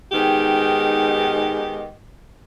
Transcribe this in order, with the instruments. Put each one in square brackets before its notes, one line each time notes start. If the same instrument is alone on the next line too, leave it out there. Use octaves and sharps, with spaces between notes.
[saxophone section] G#2 D#3 B3 G4